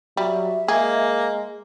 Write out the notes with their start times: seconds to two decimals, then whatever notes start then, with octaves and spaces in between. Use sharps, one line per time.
0.17 F#3 G3 E5
0.68 G#3 A#3 G#4